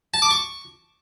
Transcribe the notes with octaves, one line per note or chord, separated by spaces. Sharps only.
A5
D6
C#6